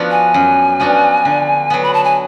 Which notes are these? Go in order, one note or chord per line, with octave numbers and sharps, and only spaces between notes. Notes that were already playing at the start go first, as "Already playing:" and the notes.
Already playing: F3 B3 D4 F#4
G#5
F#2
F3 B3 D4 F#4
D3
F#3 B3
B5
A5
G#5